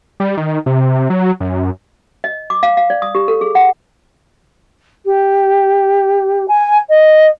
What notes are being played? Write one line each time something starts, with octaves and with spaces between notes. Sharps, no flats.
G3
D#3
C3
F#3
F#2
D#5
D6
F5
F5
D5
D#6
G4
A4
G#4
F#5
G4
G#5
D#5